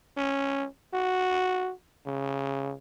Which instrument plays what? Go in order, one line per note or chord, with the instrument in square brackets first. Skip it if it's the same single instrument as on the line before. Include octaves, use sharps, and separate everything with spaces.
[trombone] C#4
F#4
C#3